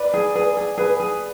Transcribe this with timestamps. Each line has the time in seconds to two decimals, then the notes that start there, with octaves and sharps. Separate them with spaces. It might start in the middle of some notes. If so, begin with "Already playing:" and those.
Already playing: B4 D5
0.14 G#4
0.35 G#4 B4
0.57 G#4
0.78 G#4 B4
1.00 G#4